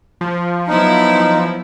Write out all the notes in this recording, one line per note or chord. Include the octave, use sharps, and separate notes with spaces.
F3
F#3 B3 D#4 E4